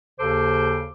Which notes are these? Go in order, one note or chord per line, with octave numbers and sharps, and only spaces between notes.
D#2 C#3 A4 C5 D6